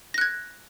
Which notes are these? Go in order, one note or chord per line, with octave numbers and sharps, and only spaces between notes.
F#6 G#6 A#6